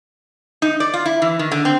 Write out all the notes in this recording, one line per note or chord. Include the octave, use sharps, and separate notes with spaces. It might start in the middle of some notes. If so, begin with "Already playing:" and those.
D#4
D5
F4
E4
E3
D#3
D3
C4